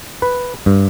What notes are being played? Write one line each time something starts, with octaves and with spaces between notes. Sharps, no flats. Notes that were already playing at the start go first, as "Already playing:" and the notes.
B4
G2